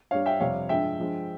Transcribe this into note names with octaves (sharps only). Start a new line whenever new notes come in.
G2 G3 C#5 F5
E5 G5
F2 C3 G3 C#5 F5
G2 F3 G#3 E5 G5
G2 F3 G#3